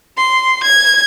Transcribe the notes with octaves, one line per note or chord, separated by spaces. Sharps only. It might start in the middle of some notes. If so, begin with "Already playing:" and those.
C6
G#6